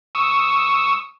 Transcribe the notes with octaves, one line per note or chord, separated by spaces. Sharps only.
C#6 D#6 E6